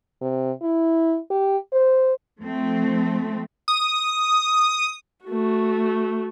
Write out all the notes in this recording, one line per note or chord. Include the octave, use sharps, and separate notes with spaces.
C3
E4
G4
C5
F3 A3 C4
D#6
A3 F#4